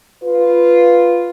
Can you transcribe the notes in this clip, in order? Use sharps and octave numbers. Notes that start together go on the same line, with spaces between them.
F4 B4